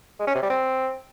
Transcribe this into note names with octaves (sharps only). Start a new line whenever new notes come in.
G#3
C#4
C3
G3
C4